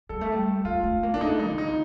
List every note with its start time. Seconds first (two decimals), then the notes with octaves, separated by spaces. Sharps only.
0.09 G3 A4
0.21 A3
0.32 G3
0.65 A3 F4
0.84 A3
1.03 A#3
1.14 D4
1.21 A3 D#4
1.39 D#4
1.49 C3
1.58 D#4